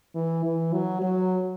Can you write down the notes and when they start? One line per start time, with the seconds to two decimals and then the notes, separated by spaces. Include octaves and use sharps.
0.15 E3
0.44 E3
0.73 F#3
1.02 F#3